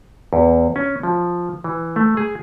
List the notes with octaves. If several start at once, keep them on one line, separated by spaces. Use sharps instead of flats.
E2
C#4
F3
E3
A3
G#4